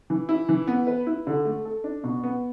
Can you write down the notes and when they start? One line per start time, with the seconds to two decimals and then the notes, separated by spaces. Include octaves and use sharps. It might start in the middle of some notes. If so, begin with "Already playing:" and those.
0.10 E3
0.29 E4
0.49 E3
0.67 B3
0.87 B4
1.07 E4
1.27 D3
1.45 A3
1.65 A4
1.84 D4
2.04 B2
2.23 B3